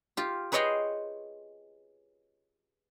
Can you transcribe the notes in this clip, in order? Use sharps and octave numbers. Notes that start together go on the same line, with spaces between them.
F4 G4
G#4 B4 C#5 D#5 G5 C6